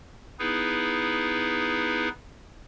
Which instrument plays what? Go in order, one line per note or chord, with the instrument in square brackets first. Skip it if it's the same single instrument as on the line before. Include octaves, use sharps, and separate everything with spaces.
[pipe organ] B3 D#4 E4 G#4 B4